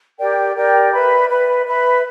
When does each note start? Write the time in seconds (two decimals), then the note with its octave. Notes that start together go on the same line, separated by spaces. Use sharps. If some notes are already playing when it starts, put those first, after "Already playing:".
0.18 G4 A#4 D5 G5
0.55 G4 A#4 D5 G5
0.92 B4 E5 B5
1.28 B4 E5 B5
1.65 B4 E5 B5